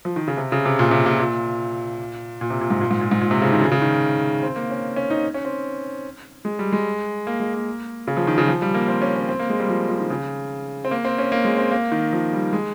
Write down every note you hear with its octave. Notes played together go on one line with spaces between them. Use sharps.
F3
D#3
C#3
C3
C#3
C3
A#2
C3
A#2
A#2
A#2
C3
A#2
G#2
A#2
G#2
A#2
G#2
A#2
C3
C#3
D#3
C#3
C#3
D#3
C4
A#3
C#4
C#4
D#4
C#4
C4
G#3
G3
G#3
A#3
G#3
A#3
C#3
F3
D#3
C#3
F3
G3
A#3
C4
C#4
C#4
C4
A#3
G#3
G3
F3
F3
D#3
C#3
C4
A#3
C4
C#4
A#3
G#3
C4
A#3
D#3
F3
G3
G#3